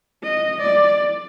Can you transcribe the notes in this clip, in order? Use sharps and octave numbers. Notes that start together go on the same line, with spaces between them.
D#5
D5